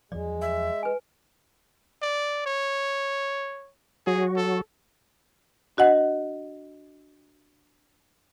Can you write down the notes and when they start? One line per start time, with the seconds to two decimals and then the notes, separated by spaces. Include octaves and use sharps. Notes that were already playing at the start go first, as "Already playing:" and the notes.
0.12 E2 F3 F#3 G#3 D5
0.41 E5
0.83 B4 G#5
2.02 D5
2.46 C#5
4.07 F#3 F#4 G#4
4.37 A4
5.77 D4 F#4 D#5 F#5